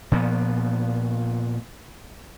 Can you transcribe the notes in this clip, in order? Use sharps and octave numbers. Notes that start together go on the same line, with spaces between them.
A#2 F3 B3